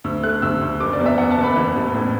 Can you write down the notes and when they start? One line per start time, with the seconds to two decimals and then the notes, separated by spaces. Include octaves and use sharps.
0.04 D2 E6
0.23 A3 F#6
0.42 D2 E6
0.61 D2
0.80 F#1 D6
0.93 D5
0.99 E2
1.06 E5
1.18 E2 F#5
1.31 A5
1.38 F#1
1.44 B5
1.56 E3
1.76 A1
1.94 A2